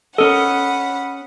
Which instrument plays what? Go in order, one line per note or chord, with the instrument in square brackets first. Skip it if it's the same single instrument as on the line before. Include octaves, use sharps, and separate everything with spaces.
[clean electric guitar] C#4 D#5 [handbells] A4 A#4 [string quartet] F#5 B5